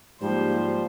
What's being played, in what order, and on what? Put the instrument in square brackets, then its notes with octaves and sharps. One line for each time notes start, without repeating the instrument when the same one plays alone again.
[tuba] G#2 [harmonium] F3 G3 [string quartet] A#3 C5 [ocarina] G4